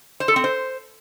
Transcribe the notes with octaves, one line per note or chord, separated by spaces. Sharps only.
C5
A4
C4
C5